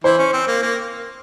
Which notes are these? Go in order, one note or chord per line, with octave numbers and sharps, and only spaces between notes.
E3 E4 C5
C#4
C4
A#3
A#3